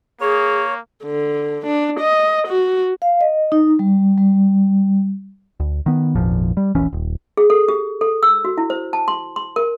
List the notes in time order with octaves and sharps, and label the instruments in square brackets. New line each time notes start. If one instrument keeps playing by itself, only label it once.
[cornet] A#3 [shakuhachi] G#4 [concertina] C#5
[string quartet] D3
D4
D#5
F#4
[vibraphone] F5
D#5
D#4
G3
G3
[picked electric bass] D2
D#3 B3
G#1 E2 A#2 F3
G3
E1 A#1 E3 C#4
D#1
[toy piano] G#4
A4
G4
A4
E6
F#4
E4
C5
A5
C6
C6
A#4